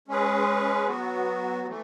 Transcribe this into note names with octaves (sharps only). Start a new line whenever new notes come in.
G#3 C#4 G#4 B4
F#3 B3 F#4
E3 A3